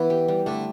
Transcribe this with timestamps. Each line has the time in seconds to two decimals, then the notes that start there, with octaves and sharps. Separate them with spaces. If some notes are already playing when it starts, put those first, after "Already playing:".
Already playing: E3 B3 E4
0.10 G4
0.28 G3
0.46 D3 A3